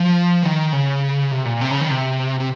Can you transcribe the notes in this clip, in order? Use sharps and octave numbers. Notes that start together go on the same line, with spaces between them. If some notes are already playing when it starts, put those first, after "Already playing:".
Already playing: F3
D#3
C#3
C3
A#2
C3
C#3
D#3
C3
C3